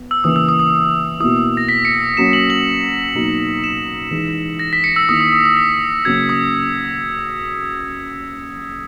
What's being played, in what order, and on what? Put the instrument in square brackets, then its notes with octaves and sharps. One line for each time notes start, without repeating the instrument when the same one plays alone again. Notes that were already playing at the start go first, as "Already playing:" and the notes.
Already playing: [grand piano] B3
[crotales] E6
[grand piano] C#3 E3 A#3 [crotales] D#6
[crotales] E6
D#6
D#6
[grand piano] B2 A#3 E4 [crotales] D#6
[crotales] A#6
B6
C#7
[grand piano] F#3 A#3 C#4 [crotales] E7
[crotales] F#7
F#7
[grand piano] B2 F#3 A#3 D#4
[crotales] E7
[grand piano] E3 G#3 D#4
[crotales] A#6
B6
C#7
E6
[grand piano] D#3 A#3 E4 [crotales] D#6
[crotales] D#6
D#6
D#6
B6
[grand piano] C#3 F#3 A#3 C#4 [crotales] G#6
[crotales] D#6